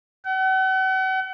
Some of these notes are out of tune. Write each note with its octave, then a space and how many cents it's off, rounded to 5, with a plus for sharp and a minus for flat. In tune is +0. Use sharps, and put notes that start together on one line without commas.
F#5 +40